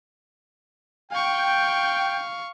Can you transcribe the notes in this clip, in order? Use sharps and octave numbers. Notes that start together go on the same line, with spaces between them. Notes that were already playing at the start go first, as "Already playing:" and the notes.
F5 G5 C#6